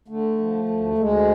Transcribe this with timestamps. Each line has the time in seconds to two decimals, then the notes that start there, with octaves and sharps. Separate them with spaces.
0.08 D3 A3
0.38 F3
0.69 D2
0.98 D2 G#3